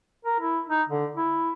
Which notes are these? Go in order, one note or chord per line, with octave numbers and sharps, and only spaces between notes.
A#4
E4
D#4
D3
E4